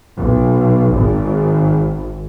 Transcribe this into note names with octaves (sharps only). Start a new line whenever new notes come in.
B1
G#1